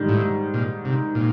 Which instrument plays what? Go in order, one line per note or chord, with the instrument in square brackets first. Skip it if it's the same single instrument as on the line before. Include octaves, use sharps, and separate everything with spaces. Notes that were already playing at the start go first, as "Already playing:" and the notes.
Already playing: [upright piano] G#2 D#3 G3
[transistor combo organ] A2
A#2
C3
A#2